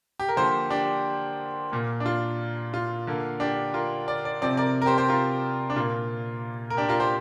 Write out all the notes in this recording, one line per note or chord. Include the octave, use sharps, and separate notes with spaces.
G4
A#4
D3 F3 A#3 G4 C5
D4 G4
A#2 A#3
D4
F4
F4
D3 A#3
D4 G4
F4 A#4
D5
D5
C3 F3 C4 D5
A#4 D5
A#4
G4 C5
G4 C5
F4 A#4
D4
A#2 A#3 F4
A#4
D4 G4
F4 A#4
G4 C5